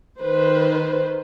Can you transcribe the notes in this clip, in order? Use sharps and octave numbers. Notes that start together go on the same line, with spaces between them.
D#3 B4 C5